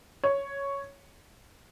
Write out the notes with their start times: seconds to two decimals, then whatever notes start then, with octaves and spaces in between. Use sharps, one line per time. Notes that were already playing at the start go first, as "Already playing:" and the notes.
0.24 C#5